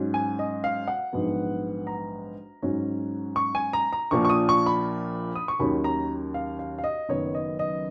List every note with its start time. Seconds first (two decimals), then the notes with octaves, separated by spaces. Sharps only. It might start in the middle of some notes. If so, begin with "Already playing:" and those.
Already playing: G#2 F#3 C#4
0.14 G#5
0.39 D#5
0.64 F5
0.88 F#5
1.13 A#1 G#2 F#3 B3
1.87 A#5
2.62 G#2 F#3 C#4
3.36 C#6
3.55 G#5
3.73 A#5
3.93 A#5
4.11 A#1 A#2 F3 A#3 C#6
4.25 C#6
4.30 D#6
4.49 C#6
4.66 B5
5.35 D#6
5.48 C#6
5.59 D#2 D#3 F#3 C#4 B5
5.84 A#5
6.34 F5
6.59 F5
6.78 F5
6.84 D#5
7.09 F#1 F#2 D#3 F#3 B3 C#5
7.34 D#5
7.59 D#5